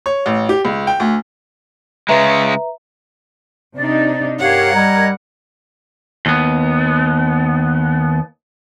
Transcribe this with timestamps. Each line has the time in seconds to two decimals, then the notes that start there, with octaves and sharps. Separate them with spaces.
0.06 C#5
0.26 A1
0.49 G4
0.65 C#2
0.87 G5
1.00 D2
2.09 C#3 G#3 B4 E5 A#5
3.75 C3 D4 D#4 D5
4.39 G2 G4 A#4 C#5 F5 F#5
4.73 G3 D#5 A#5 G#6
6.26 D#2 B3